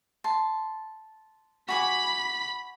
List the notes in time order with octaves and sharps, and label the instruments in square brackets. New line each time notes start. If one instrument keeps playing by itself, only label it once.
[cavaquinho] A5 C6
[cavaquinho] F#4 G#5 D6 [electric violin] B5 B6